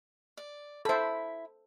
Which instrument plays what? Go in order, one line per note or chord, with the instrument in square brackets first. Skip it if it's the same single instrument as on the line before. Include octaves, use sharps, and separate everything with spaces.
[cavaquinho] D5
[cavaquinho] E4 B5 [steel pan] A4 C5